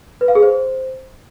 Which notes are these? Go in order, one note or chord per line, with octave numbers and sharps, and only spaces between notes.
B4
F5
G#4
C5